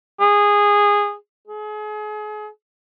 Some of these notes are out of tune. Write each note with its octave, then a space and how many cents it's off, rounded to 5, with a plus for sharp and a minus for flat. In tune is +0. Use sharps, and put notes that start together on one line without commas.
G#4 -15
G#4 +35